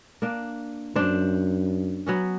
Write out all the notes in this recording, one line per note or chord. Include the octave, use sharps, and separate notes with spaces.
A#3 D4
F#2 D4 C5
F#3 B3 C#4